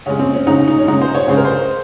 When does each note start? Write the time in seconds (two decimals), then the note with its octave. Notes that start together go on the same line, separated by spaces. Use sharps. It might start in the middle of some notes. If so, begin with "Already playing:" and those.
0.06 C#3 G#3 C#4
0.19 C4
0.33 C#4
0.47 C#3 G#3 D#4
0.68 D#4
0.78 C#4
0.87 C#3 G#3 D#4
1.01 C5
1.15 C#5
1.28 C#3 G#3 C5
1.37 A#4
1.45 C5